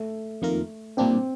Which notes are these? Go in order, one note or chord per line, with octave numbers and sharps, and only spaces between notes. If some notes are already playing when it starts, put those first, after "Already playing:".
Already playing: A3
F2 D#3 A#3 F4 A#4
A#2 G3 A#3 C4 D4 G4